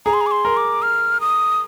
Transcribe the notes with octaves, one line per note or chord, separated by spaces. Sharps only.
G#4 A#5
C6
A#5
D6
C6
A#4
D6
F6
D#6